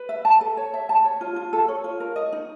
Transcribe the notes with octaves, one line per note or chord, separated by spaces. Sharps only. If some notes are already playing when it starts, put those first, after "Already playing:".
Already playing: B4
E5
A5
A4
C#5
E5
A5
C#5
F4
F4
A4
C#5
F4
A#4
D#5
D#4